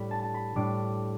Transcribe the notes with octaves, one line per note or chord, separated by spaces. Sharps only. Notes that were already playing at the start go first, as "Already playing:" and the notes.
Already playing: A2 G3 D4 B5
A5
A5
B5
A2 G3 D4 D6